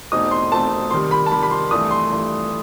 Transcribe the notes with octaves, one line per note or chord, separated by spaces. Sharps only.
E2 B2 A3 C4 D#4 D#6
C6
E2 B2 A3 C4 D#4 A5
C3 D#3 G3 C6
B5
A5
C3 D#3 G3 B5
B5
C6
G2 E3 A3 D#6
C6
G2 E3 A3